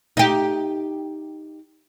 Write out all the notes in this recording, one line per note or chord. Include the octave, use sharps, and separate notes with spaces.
D#4 G4